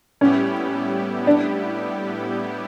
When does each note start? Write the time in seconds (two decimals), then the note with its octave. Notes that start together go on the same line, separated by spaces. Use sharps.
0.21 A2 G3 B3 C#4 E4 G4
1.27 D4